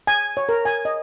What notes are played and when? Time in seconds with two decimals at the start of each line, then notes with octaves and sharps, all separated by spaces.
0.07 G#5
0.37 C#5
0.49 A#4
0.65 G#5
0.85 D#5